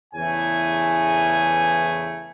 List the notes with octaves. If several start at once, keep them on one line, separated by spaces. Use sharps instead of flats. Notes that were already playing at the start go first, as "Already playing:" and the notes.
E2 C#3 E3 A3 G#5